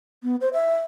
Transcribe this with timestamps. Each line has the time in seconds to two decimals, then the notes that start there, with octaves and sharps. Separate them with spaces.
0.23 B3
0.41 C5
0.53 E5